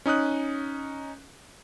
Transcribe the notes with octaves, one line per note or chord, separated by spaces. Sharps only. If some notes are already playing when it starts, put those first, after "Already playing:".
C#4 D#4 D#6 F#6